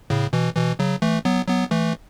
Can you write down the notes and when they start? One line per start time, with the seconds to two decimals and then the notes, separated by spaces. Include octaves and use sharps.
0.10 A2 C#3
0.33 B2 E3
0.56 B2 E3
0.79 C#3 F#3
1.02 E3 A3
1.25 F#3 B3
1.48 F#3 B3
1.71 E3 A3